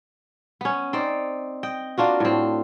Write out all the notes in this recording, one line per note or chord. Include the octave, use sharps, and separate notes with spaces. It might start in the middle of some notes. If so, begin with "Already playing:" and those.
B3 C#4
C4 D#4 D5
D#5 G5
A#3 D4 F4 F#4
A2 C4